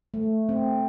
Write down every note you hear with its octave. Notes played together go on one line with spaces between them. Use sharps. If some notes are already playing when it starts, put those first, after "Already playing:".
A3
C4